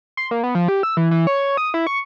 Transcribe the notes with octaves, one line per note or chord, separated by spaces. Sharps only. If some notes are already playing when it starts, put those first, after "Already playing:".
C6
A#3
B3
F3
G4
E6
E3
E3
C#5
D#6
E4
C#6